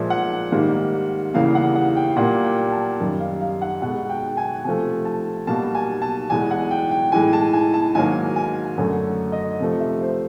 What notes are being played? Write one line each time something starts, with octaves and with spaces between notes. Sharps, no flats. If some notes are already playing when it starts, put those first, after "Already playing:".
Already playing: A#2 F3 G#3 E5
F#5
G#2 D#3 G3 A#3
E2 C#3 E3 G3 A#3 F5
F#5
F#5
G5
A#2 G3 A#3 F#5
G5
A5
F#2 D#3 G3
F5
F5
F#5
B2 G#3 F#5
G5
G#5
C3 F3 A3 G#5
A5
B2 G3 A#3 A5
G#5
A5
E2 B2 G#3 G#5
F#5
G5
G5
A2 E3 G#3 G#5
A5
G#5
A5
G#2 D#3 F#3 A#3 G#5
G#5
F#2 D3 F#3 A3 G#5
D#5
C3 F3 A3
E5
C5